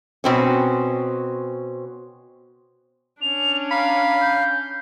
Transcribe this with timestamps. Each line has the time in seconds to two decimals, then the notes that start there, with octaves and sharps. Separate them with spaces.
0.24 B2 C4 C#4
3.22 C#4 D4 F7
3.71 F5 A#5 B5
4.21 G6